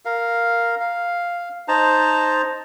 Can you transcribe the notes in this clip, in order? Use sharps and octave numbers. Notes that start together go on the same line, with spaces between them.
A#4 F5
F5
D#4 C5 A5 A#5